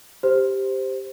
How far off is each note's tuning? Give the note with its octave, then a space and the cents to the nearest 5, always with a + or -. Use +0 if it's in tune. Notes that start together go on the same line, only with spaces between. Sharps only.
G4 +0 C5 +0